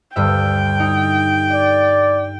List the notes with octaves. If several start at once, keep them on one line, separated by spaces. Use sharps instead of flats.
D2 G2 E5 G5
D#4
D5